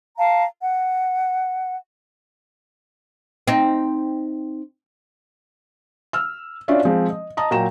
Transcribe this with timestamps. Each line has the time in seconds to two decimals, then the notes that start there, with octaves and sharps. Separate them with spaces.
0.17 F5 A5 A#5
0.61 F#5
3.47 C4 D#4
6.13 E6 F6
6.68 C#4 D4 F4 F#4 D5 E5
6.85 F3 G#3 C4
7.10 D#5
7.37 D#5 A5 A#5 D#6
7.51 A#2 F#3 G5 A#5 E7